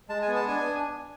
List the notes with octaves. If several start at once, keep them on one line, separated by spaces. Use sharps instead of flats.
G#3 A5
G#5
B3
A5
D4 G#5